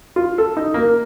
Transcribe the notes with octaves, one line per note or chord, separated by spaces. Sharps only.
F4
A4
D#4
A#3